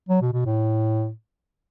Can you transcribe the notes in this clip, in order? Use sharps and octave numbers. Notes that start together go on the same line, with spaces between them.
F#3
B2
B2
A2